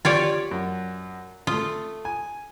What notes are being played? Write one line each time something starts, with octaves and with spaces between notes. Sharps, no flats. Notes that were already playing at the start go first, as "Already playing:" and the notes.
F4 G4 C#5 D5 G5
F#2
A3 F4 D#6
G#5